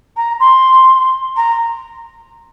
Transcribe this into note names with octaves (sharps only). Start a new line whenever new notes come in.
A#5
C6
A#5